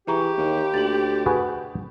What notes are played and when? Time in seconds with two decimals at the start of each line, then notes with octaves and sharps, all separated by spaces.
0.07 E3 G4 G#4 A#5 C#6
0.37 D#2
0.74 D2 A6 F#7
1.26 F#4 G#4 B4